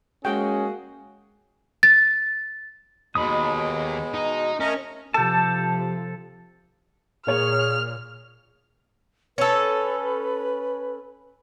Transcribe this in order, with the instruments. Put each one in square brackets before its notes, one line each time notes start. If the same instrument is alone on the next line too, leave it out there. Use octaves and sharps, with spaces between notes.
[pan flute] G#3 [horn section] A#3 F#4 G#4 [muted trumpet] C#4 [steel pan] G5
[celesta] A6
[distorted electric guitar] D#2 [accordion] B2 G#3 [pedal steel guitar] B5 D#6
[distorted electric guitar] D#4
[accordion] A3 A#4 D#5 [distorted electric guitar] C#4
[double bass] C3 F3 [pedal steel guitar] G4 A5 [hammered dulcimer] A4
[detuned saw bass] A#2 [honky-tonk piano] A#3 C#5 F7 [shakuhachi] G#4 [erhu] F6
[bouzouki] C#4 A4 [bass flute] B4